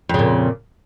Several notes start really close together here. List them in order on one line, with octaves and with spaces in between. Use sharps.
F2 C#3 A#2